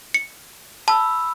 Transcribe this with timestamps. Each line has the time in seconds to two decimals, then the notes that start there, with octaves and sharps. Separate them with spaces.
0.14 C#7
0.88 A5 B5 E6